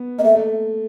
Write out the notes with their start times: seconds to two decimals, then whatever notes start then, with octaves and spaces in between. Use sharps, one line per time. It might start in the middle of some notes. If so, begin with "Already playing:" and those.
Already playing: B3
0.18 A#3 D#5
0.24 A3 E5
0.35 A3